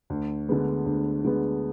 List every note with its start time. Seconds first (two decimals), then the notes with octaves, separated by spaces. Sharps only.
0.10 D2
0.49 D3 G#3 B3
0.86 D2
1.25 D3 G#3 B3